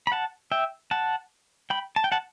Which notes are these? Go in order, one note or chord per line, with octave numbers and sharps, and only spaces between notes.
B5
F#5 A5
E5 G5
F#5 A5
G5 B5
A5
G5
F#5 A5